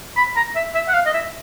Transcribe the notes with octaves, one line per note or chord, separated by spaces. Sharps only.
B5
A#5
E5
E5
F#5
F5
D#5
E5